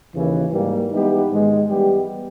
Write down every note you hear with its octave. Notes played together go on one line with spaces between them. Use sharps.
D#2 C#3 E3
G#2 G3 A#3
E3 G#3 B3 D#4 G4
G#2 D#3 G#3
E3 G3 B3 G4